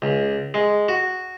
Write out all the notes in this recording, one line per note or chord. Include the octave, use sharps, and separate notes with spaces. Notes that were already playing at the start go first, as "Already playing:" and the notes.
C#2
G#3
F#4